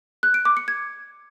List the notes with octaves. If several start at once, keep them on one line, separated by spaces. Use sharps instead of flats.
F#6
D7
D6
C#7
G#6